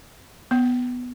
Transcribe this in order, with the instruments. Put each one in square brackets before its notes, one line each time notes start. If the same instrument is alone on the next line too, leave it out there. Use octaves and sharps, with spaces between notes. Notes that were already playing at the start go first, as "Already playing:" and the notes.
[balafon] B3